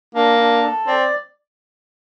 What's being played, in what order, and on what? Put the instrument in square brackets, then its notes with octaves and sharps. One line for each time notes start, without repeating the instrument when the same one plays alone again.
[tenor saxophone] A#3 [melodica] D4
[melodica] D4
A4
[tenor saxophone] C4 [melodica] D5